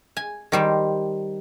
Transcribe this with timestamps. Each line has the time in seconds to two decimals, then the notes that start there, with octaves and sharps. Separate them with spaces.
0.17 G#5
0.52 D#3 G3 C5